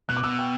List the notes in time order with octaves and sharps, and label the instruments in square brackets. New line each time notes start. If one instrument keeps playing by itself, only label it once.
[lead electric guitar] B2 [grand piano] F#6
[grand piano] D6
[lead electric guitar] B2 [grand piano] E6
[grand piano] G5